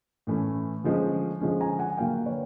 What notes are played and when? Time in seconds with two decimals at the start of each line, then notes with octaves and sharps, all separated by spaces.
0.27 A2 E3 A3 C#4
0.84 D3 F3 G#3 C#4
1.41 D3 F3 G#3 C#4
1.61 G#5 A#5
1.79 F#5 G#5
1.98 D3 F#3 A#3 F5 G5
2.26 B4 C#5